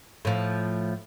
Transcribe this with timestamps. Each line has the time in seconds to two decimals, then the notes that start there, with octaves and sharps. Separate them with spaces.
0.25 A2 F3